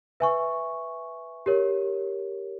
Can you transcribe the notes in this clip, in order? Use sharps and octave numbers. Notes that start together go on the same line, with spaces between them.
B4 E5 G#5 C#6
G4 A#4 C#5